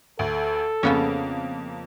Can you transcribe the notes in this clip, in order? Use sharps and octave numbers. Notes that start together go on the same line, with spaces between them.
D2 A4
F2 C#3 A#3 B3 C#4